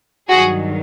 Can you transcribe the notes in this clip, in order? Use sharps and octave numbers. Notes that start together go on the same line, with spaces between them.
G2 D#3 F#3 F#4 G#4